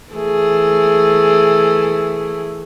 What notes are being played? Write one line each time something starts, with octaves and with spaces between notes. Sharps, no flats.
E3 A3 G#4